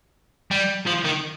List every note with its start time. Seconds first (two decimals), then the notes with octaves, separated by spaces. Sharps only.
0.51 G3
0.87 F3
1.05 D#3